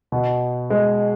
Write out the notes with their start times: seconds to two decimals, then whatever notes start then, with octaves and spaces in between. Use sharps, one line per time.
0.12 B2
0.70 G#3